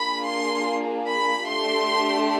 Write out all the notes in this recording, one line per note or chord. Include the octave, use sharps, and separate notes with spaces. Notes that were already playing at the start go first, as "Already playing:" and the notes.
Already playing: A#3 D4 F4 G#4 B5
C6
B5
A3 D4 G4 C6